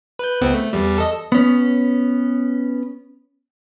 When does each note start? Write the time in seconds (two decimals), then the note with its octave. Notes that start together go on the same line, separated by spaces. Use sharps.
0.19 B4 G6
0.41 C#2 B3 C4
0.54 A3
0.73 E2 G3
0.98 A4 D#5
1.32 B3 C#4